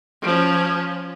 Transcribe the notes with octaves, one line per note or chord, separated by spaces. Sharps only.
F3 C#4